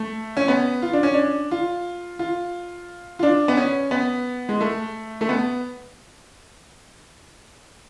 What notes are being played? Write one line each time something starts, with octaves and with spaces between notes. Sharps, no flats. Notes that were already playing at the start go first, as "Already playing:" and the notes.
Already playing: A3
C#4
B3
F4
D4
C#4
D4
F4
F4
F4
D4
B3
C#4
B3
G#3
A3
A3
B3